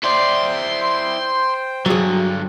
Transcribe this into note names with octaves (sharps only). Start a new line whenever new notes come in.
E4 C5 D5 G5 C6
G2 D3 F#3 G#4